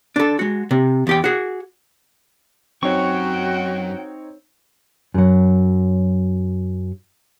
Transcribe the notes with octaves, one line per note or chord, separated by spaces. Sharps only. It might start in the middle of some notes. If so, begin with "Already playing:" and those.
D4 A4
G#3 F#4
C3
E2 G4 G5
F#4 G#4
F#2 C4 D#4 F#4 C#5 G5 C#6
F#2 F#3